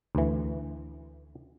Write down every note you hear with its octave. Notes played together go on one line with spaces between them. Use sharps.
D2 E3